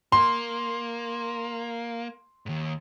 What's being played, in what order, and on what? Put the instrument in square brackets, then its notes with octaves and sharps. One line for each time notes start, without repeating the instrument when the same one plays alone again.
[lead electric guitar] A#3 [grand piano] C6
[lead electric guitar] D#2 G#2